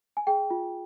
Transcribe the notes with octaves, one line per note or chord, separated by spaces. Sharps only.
G#5
G#4 G5
F4